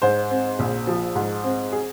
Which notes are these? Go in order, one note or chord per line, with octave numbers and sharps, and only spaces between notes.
G#2 C5
C4
A#1
F3
G#2
C4
G#4